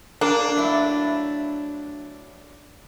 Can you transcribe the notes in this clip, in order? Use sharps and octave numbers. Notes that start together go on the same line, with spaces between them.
A#3 D4
F#3 A3 E4